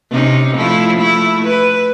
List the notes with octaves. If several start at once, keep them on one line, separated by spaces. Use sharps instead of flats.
C3 C#4 D#4
F3 A3 E4
A3 E4
B4